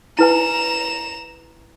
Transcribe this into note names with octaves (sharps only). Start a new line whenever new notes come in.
E4 B4 G#5 A#5 E7